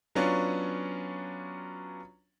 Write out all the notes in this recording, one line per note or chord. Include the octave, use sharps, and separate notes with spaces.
F#3 B3 C#4 D4 F4